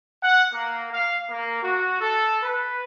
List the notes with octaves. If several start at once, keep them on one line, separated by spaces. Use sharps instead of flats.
F#5
A#3
F5
A#3
F#4
A4
B4